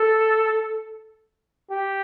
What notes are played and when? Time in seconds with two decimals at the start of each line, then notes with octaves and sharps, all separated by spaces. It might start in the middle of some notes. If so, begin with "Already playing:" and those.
Already playing: A4
1.71 G4